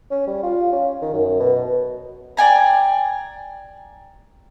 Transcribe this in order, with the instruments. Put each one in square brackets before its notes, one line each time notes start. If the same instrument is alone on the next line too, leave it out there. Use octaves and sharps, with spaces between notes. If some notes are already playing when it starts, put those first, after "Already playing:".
[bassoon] C#4
G3
F4
C#4
D#3
F#2
B2
[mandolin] D5 G5 G#5 A#5